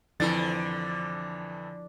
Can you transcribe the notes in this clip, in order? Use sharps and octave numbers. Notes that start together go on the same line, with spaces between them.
F2 D3 E3 F3 E4 A6